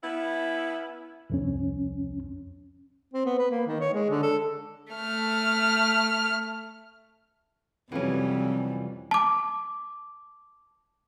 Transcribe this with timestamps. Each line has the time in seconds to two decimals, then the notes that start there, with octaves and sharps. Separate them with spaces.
0.03 B3 C#4 E4
1.30 C2 F2 C#4
3.13 C4
3.26 B3
3.38 B4
3.50 A#3
3.67 D#3
3.80 C#5
3.93 G#3
4.10 D3
4.23 A4
4.93 A3 F6
7.92 F2 C3 E3 F#3 G3 C#4
9.11 A5 D6